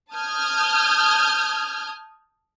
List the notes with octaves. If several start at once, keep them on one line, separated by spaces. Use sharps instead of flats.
A5 D#6 F6 G6 G#6